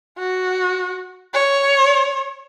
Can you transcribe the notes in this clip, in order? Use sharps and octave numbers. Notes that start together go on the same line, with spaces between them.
F#4
C#5